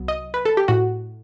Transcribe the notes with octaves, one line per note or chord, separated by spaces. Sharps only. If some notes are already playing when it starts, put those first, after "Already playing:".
Already playing: C2 F#3 B3
D#5
B4
A4
G4
A2 F#4